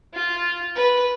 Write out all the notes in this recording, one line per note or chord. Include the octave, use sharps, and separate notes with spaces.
F4
B4